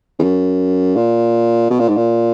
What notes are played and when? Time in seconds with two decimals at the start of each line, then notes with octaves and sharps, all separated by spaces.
0.19 E2
0.23 F#2
0.96 A#2
1.70 B2
1.80 A#2
1.88 G#2
1.97 A#2